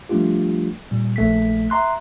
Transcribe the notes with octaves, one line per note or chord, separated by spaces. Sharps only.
F3 G3 A3 D4 F4 G4
A#2 G3
A#1 A3 B6
E5 A#5 C6 F#6